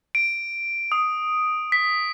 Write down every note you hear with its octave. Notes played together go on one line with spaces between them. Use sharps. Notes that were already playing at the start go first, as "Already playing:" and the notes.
D7
D#6
B6